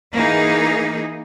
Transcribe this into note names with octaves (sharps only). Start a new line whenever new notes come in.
E3 A#3 D#4 G#4